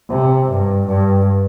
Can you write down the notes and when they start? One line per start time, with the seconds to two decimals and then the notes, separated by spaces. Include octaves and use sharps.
0.10 C3
0.49 G2
0.88 G2